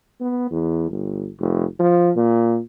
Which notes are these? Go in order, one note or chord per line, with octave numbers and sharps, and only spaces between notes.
B3
E2
G1
F1
F3
A#2